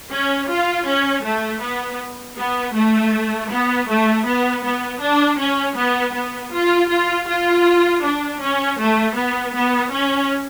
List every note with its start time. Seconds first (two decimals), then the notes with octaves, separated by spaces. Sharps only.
0.12 C#4
0.49 F4
0.87 C#4
1.24 A3
1.62 B3
2.37 B3
2.76 A3
3.51 B3
3.88 A3
4.26 B3
4.64 B3
5.01 D4
5.40 C#4
5.76 B3
6.14 B3
6.52 F4
6.90 F4
7.28 F4
8.03 D4
8.41 C#4
8.79 A3
9.16 B3
9.55 B3
9.93 C#4